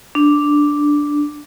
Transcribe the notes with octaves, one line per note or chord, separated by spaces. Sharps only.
D4